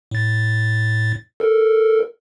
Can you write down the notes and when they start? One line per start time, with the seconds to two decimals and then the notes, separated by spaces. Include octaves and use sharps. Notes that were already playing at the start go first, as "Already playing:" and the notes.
0.11 A2 A6
1.40 A4 A#4